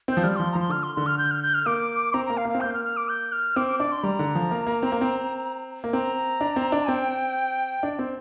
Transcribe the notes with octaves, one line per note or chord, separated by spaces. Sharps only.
C4 G6
F3
G3 F6
F3 C6
A#5
F3 C6
D3 F6
C6
D3 C6
F6
G6
F6
G6
F6
A#3 D6
C4 A#5
A#3 A#5
F5
A#3
F5
C4
A#3 G6
F6
F6
D6
G6
F6
C4 D6
D6
D4 D6
C6
G3 A#5
D3
F3
A#3
A#3
C4
A#3
C4
A#3
C4 A#5
D4
C4
D4
C4 G5
D4
C4